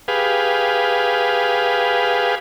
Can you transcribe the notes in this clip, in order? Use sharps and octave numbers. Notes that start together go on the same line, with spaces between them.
G4 G#4 B4 F5